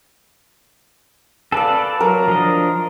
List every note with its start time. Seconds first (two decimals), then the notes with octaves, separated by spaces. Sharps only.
1.52 A4 B4 D5 F5 A5
2.00 F#3 A#4 A#5
2.28 F3 D4 D#5